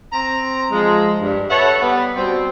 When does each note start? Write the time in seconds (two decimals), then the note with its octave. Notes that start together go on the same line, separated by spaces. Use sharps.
0.13 C4 A#5
0.72 F3 G#3
1.21 G2
1.50 A4 B4 C#5 E5 F#5
1.80 G3 B3
2.16 B2 G3 C4